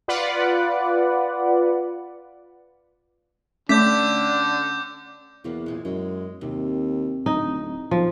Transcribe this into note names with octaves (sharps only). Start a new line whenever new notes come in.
F4 B4 D5 F#5
D3 A3 C#4 D4 D6 G6 B6
E2 F#3 A#3 B3
F#2 A#2 G#3
F#2 G#3
D#2 C3
D1 D#4
B1 F3